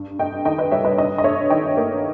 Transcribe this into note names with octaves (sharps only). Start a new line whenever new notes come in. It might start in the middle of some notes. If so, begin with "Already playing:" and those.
Already playing: G2
G2 D#5 G5
D#3 D#5 G5
B4 D#5
G3 C#5 E5
B4 D#5
G2 B4 D#5
D#5
G2 C#5 E5
D#3 D#5 G5
A#3